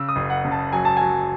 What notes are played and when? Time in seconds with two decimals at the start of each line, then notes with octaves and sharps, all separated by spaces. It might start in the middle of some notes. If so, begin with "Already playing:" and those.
Already playing: C#3 E6
0.09 D#6
0.16 F#1
0.30 F#5
0.45 C#3
0.52 A5
0.73 F#3 G#5
0.85 A5
0.97 F#3 G#5